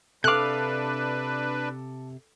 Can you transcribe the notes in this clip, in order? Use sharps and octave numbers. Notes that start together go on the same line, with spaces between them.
C3 D4 A4 B4 F5 D6 F#6